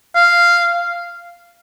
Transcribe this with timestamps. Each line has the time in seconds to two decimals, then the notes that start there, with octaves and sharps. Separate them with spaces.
0.16 F5